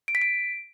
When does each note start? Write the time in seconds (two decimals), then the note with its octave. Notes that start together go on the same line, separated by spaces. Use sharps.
0.08 D7
0.15 B6
0.21 D7